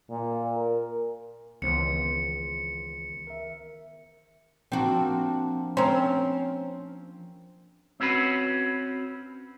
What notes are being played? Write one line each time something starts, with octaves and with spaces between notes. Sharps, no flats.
A#2
A#4
C#2 D#3 E3 B3 C5 C#7
A#4 E5
F3 A#3 C4 D4 F#4
C4 C#4 A#4 C5
C4 C#4 F#4 B4